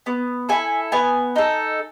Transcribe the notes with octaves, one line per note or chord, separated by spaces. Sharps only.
B3
E4 A4 G#5
B3 G#5
D#4 A4